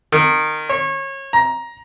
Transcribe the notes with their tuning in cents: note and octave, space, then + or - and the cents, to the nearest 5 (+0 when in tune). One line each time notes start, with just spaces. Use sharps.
D#3 -20
C#5 -30
A#5 +15